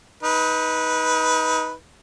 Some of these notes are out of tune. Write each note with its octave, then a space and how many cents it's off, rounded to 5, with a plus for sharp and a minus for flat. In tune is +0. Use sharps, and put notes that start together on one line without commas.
D#4 +20 B4 -10